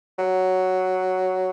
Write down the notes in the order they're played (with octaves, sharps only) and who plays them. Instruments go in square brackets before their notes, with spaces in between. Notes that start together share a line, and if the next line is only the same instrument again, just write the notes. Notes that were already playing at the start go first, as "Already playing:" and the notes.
[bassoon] F#3